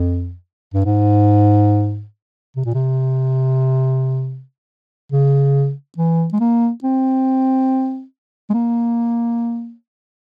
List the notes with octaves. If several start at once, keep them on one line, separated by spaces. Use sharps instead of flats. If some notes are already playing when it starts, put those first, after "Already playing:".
Already playing: F2
G2
G#2
C3
A#2
C3
C#3
E3
G#3
A#3
C4
G#3
A#3